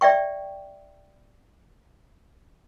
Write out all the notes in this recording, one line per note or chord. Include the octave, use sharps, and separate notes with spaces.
D5 E5 G5 C#6